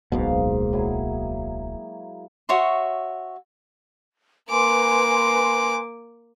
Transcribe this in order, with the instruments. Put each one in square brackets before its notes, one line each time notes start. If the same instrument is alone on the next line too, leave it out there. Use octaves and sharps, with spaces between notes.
[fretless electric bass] D1 B1 B2 [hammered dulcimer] G#2 A#3 F5
[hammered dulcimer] F#3 E4 G#4
[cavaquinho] F#4 C#5 E5 C6
[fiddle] A#3 D6 [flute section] B4 G#5 C6